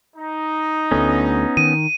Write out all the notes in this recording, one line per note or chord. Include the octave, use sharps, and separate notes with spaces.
D#4
D2 A3 B3 C#4
D#3 D#7